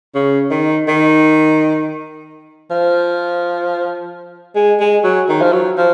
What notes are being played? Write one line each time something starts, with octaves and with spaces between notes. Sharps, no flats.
C#3
D#3
D#3
F3
G#3
G#3
F#3
D#3
F3
F#3
F3